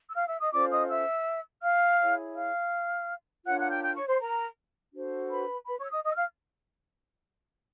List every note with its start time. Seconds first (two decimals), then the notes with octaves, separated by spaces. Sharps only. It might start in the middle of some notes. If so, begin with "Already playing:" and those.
0.09 E6
0.15 F5 F6
0.28 E5 E6
0.40 D#5 D#6
0.52 C#4 F4 A4 C5 D5 D6
0.71 D#5 D#6
0.89 E5 E6
1.63 F5 F6
1.99 E4 G#4 C#5
2.36 F5 F6
3.46 D4 F4 A#4 C#5 F#5 F#6
3.58 F#5 F#6
3.71 G5 G6
3.83 G5 G6
3.95 C#5 C#6
4.08 C5 C6
4.20 A#4 A#5
4.93 D4 F#4 A4 C5
5.30 B4 B5
5.67 B4 B5
5.79 C#5 C#6
5.85 E6
5.92 D#5 D#6
6.04 D#5 D#6
6.11 E6
6.16 F5 F6